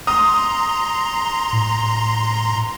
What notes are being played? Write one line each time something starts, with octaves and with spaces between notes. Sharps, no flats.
A#5 C6 D#6
A2